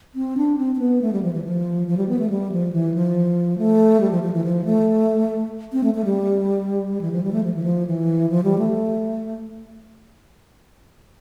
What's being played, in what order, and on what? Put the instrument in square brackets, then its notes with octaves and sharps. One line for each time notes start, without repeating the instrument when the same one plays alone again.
[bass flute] C4
D4
C4
C4
B3
A3
G3
F3
E3
F3
F3
G3
B3
A3
G3
F3
E3
F3
A3
G3
F3
F3
E3
F3
A3
C4
A3
A3
G3
E3
F3
G3
A3
F3
E3
F3
E3
F3
G3
A3